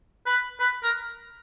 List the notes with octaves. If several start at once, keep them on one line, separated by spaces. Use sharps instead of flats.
B4
B4
A#4